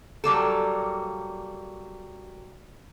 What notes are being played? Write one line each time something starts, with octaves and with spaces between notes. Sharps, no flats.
F#3 G3 A#3 A4